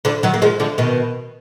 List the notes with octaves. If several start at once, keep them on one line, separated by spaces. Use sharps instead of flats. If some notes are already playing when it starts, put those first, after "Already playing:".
D3 F3
D#3 F#3
A#3
F3 G#3
D3 F3
B2 D#3